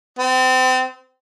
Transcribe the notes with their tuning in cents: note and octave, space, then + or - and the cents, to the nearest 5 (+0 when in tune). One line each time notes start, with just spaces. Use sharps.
C4 -30